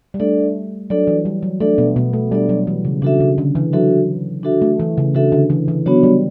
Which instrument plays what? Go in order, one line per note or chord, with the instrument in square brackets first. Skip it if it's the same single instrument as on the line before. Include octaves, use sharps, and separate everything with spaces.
[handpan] G3
[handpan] A3 [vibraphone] D4 A4 D5
[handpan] F#3 [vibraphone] D4 A4 D5
[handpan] E3
G3
F#3
[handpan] A3 [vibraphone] D4 A4 D5
[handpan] B2 B3
B2 B3
A3
[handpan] G3 [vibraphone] D4 A4 D5
[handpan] F#3
E3
C#3
[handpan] C#3 [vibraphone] D4 F#4 A4 E5
[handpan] C#3
D3
E3
[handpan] F#3 [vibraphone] D4 F#4 A4 E5
[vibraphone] D4 F#4 A4 E5
[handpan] A3
E3
C#3
[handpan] C#3 [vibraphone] D4 F#4 A4 E5
[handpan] D3
E3
E3
[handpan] F#3 [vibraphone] B3 D4 F#4 C#5
[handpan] G3